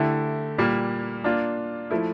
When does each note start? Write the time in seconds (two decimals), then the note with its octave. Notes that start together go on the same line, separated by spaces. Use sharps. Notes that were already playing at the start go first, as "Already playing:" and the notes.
Already playing: D3 A3 E4 G4
0.58 A#2 G3 A#3
1.24 A#3 D4 F4
1.91 F3 A3 E4